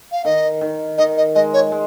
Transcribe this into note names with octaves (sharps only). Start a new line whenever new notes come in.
F5
D#3 D#5
D#3
D#3 D#5
D#5
G#3 D#5
C#5
G#3